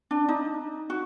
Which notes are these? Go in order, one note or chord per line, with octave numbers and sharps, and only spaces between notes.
D4
D#4
F#4